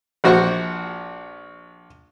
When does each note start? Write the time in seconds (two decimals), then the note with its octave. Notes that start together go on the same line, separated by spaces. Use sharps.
0.24 A#1 F#4 C5 C#6